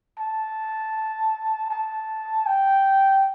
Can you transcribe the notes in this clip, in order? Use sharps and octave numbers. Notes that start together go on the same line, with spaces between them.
A5
A5
G5